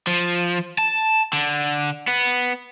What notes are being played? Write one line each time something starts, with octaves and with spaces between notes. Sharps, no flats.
F3
A5
D3
B3